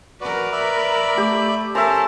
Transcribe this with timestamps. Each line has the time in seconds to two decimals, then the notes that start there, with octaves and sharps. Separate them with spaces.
0.21 F#4 A#4 B4 D5
0.52 D5 E5 B5
1.18 A3 G4
1.75 C#4 A4 A#4 C5 E5 A5 A#5